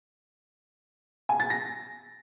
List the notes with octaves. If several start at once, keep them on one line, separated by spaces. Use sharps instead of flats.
G#5
A6
A#6